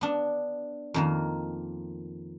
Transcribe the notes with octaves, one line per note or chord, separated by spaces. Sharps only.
B3 D4
F2 D#3 A#3